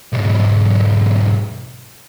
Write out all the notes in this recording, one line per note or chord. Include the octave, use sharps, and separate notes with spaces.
B1 G#2